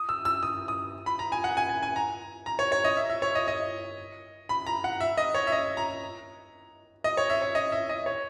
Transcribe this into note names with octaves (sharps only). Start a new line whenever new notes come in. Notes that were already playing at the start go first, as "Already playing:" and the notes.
Already playing: D#6
E6
E6
D#6
D#6
B5
A#5
G#5
F#5
G#5
G#5
G#5
A#5
A#5
C#5
C#5
D#5
E5
E5
C#5
D#5
D#5
B5
A#5
F#5
E5
D#5
C#5
E5
D#5
A#5
D#5
C#5
E5
C#5
D#5
E5
D#5
C#5